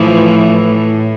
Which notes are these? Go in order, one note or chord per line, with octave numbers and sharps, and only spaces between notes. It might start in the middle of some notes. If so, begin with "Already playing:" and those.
Already playing: A2 E3 F3